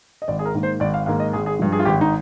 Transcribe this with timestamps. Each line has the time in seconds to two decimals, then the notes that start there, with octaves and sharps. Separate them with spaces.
0.22 D#5
0.28 G#1 D5
0.39 G#4
0.45 A#4
0.54 G#2 D#3 A#3
0.63 C5
0.80 G#1 D5
0.94 F5
1.06 G#2 D#3 A#3 F5
1.20 D#5
1.33 G#1 G#4
1.46 G#4
1.59 G2 F3
1.72 G#4
1.79 F4
1.85 G#1 G4
2.01 D#4